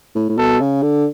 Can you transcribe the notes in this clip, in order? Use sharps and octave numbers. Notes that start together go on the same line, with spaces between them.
A2
A2
B2 A4
C#3
D3